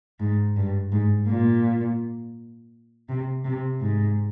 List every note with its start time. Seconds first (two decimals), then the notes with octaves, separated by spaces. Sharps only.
0.20 G#2
0.56 G2
0.92 G#2
1.28 A#2
3.09 C3
3.45 C3
3.81 G#2